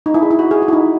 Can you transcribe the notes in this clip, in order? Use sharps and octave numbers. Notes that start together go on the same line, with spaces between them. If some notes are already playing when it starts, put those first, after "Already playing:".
D#4
E4
G#4
E4
F#4
G#4
F#4
E4
D#4